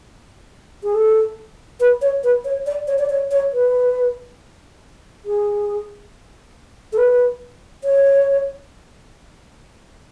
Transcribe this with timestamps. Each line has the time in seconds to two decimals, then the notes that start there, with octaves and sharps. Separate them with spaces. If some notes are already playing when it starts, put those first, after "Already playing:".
0.83 G#4
0.94 A4
1.80 B4
2.02 C#5
2.23 B4
2.45 C#5
2.66 D5
2.88 C#5
2.99 D5
3.10 C#5
3.31 C#5
3.53 B4
5.25 G#4
6.93 A4
6.98 B4
7.84 C#5